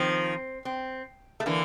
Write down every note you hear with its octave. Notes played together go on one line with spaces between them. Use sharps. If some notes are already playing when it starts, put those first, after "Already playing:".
Already playing: D#3 F3 C4
C4
A3
D3 E3 A#3